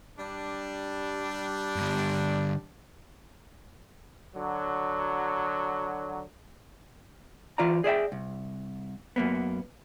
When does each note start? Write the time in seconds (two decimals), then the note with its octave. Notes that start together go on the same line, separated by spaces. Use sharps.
0.17 G3 D4
1.76 G2 D3
4.35 D3 F#3
7.58 E3 F4 D5 A#5
7.84 G#4 D5 E5 G5
8.12 C2
9.16 F#2 A#3 B3